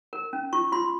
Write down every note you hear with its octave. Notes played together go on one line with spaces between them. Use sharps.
A#4
C#4
F4 C#6
F4 C6